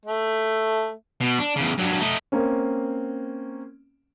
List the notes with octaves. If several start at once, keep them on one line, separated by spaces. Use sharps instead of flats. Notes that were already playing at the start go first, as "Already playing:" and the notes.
A3
B2
D4
E2 C#3
G2 F#3
A3 D#4
A#3 C4 C#4